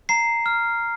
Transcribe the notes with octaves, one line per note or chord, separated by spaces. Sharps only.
A#5 C7
F6